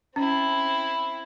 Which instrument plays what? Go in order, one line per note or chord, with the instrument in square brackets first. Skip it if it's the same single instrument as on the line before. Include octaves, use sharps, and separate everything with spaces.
[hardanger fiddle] C4 E4 [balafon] C#4